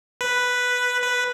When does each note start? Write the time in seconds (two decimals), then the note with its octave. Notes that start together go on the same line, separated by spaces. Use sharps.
0.21 B4
1.02 B4